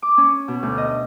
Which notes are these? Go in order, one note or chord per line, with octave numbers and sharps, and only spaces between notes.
D6
C#4
B2
D2
D#5